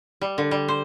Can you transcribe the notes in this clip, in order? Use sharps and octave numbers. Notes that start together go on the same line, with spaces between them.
G3
D3
G3
C5